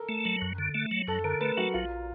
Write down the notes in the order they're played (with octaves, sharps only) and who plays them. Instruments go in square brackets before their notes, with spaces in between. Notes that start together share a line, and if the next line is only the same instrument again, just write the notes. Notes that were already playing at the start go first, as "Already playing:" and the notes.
Already playing: [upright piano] A4 A#4
[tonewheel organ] A3
F#3
F#2
D3
A3
F#3
[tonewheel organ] F#2 [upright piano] A4
[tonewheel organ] D3 [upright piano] A#4
[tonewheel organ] A3 [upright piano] B4
[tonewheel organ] F#3 [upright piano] F#4
[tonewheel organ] A#1 [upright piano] F4